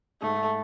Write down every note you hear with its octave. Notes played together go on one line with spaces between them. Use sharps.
G#2 A3